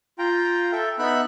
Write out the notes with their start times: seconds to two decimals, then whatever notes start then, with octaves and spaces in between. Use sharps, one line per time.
0.19 F4 G5 A#5
0.72 A4 E5 G5
0.99 B3 D#4 E5 B5 F#6